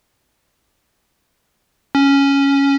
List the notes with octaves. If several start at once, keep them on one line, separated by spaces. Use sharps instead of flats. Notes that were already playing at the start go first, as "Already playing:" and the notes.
C#4